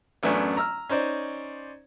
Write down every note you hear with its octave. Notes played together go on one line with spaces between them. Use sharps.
A1 F#2 A3 B3 D4 G#5
A#5 E6 F6
C#4 D#4 C5 D5